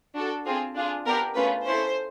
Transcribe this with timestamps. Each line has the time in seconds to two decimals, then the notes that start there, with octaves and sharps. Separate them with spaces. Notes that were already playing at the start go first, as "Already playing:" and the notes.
0.16 D4 F#4 A4
0.46 C4 F4 G#4
0.76 D4 F4 G#4
1.06 B3 D4 G4 A#4
1.35 A3 C#4 F4 G#4 B4
1.64 C#4 E4 A4 C5